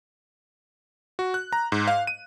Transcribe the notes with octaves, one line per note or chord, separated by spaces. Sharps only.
F#4
F#6
A#5
G#2
F5
D#7